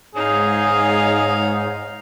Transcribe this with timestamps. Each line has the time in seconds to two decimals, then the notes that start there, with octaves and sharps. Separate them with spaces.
0.15 G#2 D#4 G#4 C#5 F5